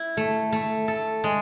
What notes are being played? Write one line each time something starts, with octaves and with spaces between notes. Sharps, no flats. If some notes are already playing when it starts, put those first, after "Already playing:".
Already playing: E4
A3
A3
A4
G#3